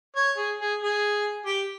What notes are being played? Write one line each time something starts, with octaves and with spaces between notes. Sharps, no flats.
C#5
G#4
G#4
G#4
G4